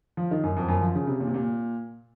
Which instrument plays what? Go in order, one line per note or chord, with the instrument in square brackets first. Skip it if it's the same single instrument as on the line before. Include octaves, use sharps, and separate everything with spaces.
[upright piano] F3
D#3
F#2
F2
F#2
F3
C#3
C3
A#2
C3
A#2